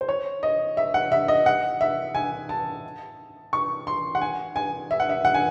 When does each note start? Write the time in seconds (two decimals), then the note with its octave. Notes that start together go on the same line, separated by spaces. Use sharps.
0.01 C5
0.09 C#5
0.43 D#5
0.77 E5
0.94 F#5
1.12 E5
1.28 D#5
1.46 F#5
1.81 E5
2.15 G#5
2.49 A5
3.53 C#6
3.87 C6
4.15 F#5
4.21 G#5
4.56 G#5
4.91 E5
5.00 F#5
5.09 E5
5.25 F#5
5.34 G#5